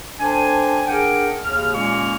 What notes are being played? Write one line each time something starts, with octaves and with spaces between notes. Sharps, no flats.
D4 A4 C5 G5 G#5
D4 G#4 A#4 F#5 G5
D#2 C#3 F6
A#2 G#3 A#3 C#4 C#6 F6